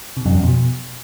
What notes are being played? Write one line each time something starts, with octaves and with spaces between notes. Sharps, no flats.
C3
F#2
F2
B2